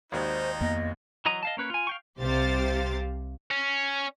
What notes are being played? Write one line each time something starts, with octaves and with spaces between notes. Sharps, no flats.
G#1 D#2 D#4 C5
F2 A#3 B3 D#5
E3 F#3 D#5 A#5 D#6
D#5 F5 A5
A#3 C#4 B4 C#5
F4 G#5
F5 G5 C#6
C2 C3 G4 C5 F5 A6
C#4